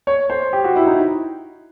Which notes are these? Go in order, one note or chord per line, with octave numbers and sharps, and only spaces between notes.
C#5
C5
G4
F#4
E4
D#4